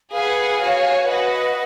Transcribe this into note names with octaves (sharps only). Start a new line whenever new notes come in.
G#4 B4 F5 F#5
F#4 C#5 G#5
F#4 B4 D#5 F#5